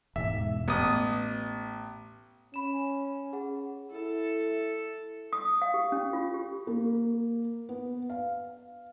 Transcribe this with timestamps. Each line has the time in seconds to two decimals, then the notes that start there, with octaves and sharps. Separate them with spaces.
0.16 E1 G#2 E5
0.68 A1 B3 D#6
2.54 C#4 B5 E7
3.33 G#4 F#5
3.92 E4 A4
5.33 D#6
5.62 F5
5.74 G4
5.92 C#4
6.13 F4
6.34 G4
6.67 A#3
7.69 B3
8.10 F5